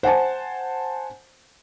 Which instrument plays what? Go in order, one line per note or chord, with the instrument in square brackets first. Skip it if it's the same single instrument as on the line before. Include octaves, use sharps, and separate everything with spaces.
[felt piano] C5 F#5 G#5 A5